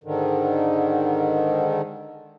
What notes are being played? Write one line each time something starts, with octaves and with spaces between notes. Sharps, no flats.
G#2 D3 D#3